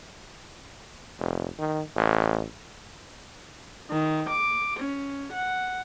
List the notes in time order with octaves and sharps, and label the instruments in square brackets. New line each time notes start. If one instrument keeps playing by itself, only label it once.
[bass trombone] F1
D#3
A1
[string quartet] D#3
D6
C#4
F#5